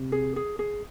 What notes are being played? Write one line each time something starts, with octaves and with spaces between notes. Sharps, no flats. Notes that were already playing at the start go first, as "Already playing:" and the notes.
Already playing: C3
G#4
G#4
G#4